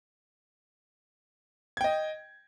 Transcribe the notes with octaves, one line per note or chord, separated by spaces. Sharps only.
D#5 G5 G#6